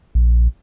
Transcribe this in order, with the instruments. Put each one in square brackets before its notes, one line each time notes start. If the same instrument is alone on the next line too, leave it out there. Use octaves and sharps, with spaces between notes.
[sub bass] A#1